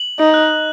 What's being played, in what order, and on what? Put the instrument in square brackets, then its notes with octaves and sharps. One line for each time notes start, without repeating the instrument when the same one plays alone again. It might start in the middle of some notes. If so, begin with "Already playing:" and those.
Already playing: [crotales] F#7
[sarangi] D#4
[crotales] F#6